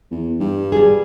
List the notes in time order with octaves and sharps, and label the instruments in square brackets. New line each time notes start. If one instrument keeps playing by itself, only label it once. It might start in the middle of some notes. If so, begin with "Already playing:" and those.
[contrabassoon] E2
G2
[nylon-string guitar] G3 G#4